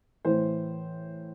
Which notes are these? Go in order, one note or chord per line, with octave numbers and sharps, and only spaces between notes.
A2 E3 C5